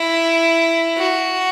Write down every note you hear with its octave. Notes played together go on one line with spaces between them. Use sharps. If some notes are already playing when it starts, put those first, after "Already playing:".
Already playing: E4
F#4